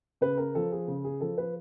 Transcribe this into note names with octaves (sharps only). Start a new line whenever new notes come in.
C#3 B4
A#4
F3 A4
G#4
C#3
G#4
F3 A4
B4